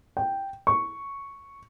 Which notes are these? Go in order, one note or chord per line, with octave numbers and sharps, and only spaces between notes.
G5
C#6